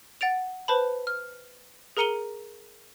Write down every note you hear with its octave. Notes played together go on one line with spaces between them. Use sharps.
F#5 A6 D7 F7
B4 C5 A5 B5
F6
G#4 A#4 A#5 C#7 D#7 G7